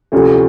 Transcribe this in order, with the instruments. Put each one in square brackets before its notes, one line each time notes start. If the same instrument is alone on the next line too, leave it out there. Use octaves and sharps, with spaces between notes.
[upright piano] D2 C3 F3 A3 C#4